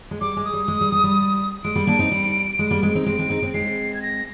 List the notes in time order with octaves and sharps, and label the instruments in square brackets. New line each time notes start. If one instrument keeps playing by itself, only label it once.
[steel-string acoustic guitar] G#3
[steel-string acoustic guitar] G3 [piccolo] D6
[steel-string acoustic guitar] G#3
[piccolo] D#6
[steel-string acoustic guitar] G3
G#3
G3
G3
G3
[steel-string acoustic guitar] G#3 [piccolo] D7
[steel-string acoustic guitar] G3 A#3
A#3 D4
C4 D#4
G3
G#3
G3 A#3
G#3 C4
C4 D#4
[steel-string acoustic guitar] G#3 C4 [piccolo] D7
[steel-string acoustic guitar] G#3 C4
C4 D#4
G#3 C4
[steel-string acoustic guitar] G#3 C4 [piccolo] C7
[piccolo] G#6
A#6